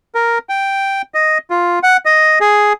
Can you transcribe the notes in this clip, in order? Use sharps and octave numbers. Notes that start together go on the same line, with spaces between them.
A#4
G5
D#5
F4
F#5
D#5
G#4